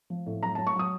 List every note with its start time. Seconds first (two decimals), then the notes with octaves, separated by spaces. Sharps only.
0.10 F3
0.26 A2
0.42 F#3 A#5
0.55 F#3 A5
0.67 C#6
0.76 F#3 D#6